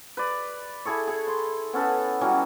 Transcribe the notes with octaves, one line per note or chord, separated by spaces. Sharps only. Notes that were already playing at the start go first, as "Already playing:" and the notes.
B4 D5
E4 G#4 A4 C#6
G#4 A4
C6
B3 C#4 A4 B4
E3 F#3 G3 C#4